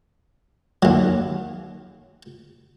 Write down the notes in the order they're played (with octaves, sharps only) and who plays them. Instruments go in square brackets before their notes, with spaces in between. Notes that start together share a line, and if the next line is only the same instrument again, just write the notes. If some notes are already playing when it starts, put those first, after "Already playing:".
[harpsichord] D#2 F#3